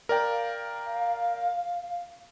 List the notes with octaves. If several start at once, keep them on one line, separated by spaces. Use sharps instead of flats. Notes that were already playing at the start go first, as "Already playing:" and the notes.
A#4 D5 F5 G5